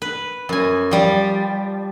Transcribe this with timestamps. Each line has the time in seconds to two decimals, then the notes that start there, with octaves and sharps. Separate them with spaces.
0.02 B4
0.49 F#2 G#5
0.91 F3 G3